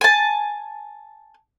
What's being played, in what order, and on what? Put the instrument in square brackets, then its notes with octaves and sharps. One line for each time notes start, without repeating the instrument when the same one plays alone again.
[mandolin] G#5 A5